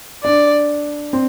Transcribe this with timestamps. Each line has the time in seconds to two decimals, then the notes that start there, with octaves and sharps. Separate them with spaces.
0.23 D4 D5
1.13 C4